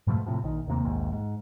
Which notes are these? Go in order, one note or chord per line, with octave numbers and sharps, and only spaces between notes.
G#2 B2 F3 A3
A2 C3 F3
A#1 D#3
D#2 C3 A#3
A#1 D#2 G#2
G#2